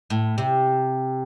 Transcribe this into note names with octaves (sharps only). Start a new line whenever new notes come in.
A2
C3